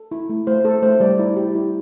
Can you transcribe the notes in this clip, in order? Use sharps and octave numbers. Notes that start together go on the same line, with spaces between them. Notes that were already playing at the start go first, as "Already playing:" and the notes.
Already playing: A4
E4
A3
A3 C5
A3 A4
A3 C5
G3 D5
E4
G4
E4